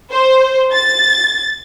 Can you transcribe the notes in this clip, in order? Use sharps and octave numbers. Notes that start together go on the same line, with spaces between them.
C5
A6